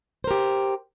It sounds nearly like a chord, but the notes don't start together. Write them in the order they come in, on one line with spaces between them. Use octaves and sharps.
C5 A#4 G4